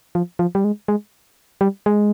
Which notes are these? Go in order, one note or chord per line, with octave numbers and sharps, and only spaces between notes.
F3
F3
G3
G#3
G#3
G3
G#3